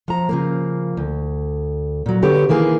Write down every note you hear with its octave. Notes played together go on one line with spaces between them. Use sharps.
F3 A#5
C#3 F3 A#3
D2
A#2 F#3
D3 B3 G4 C#5
D#3 E3 A#3 G#4